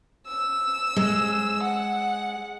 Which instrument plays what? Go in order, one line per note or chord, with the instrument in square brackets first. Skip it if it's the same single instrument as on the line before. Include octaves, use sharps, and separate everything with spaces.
[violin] E6
[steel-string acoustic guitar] G#3
[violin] F#5